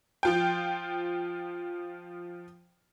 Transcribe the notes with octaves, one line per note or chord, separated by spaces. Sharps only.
F3 F4 G5